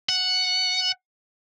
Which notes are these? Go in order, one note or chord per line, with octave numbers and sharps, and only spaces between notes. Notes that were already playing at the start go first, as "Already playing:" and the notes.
F#5